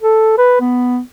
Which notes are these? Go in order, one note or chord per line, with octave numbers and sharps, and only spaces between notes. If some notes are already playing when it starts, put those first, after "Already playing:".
A4
B4
B3